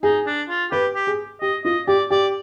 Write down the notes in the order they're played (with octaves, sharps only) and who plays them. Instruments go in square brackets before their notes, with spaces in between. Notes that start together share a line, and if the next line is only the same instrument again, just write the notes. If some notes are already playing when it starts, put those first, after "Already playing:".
[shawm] D#4 [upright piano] G#4
[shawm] D4
F4
[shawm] G4 [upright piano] B4
[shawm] G4
[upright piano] G#4
[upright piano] G4 [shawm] D#5
[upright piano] F4 [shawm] D#5
[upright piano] G4 [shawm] D5
[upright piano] G4 [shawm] D5